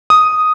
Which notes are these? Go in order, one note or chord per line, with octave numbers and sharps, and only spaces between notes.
D#6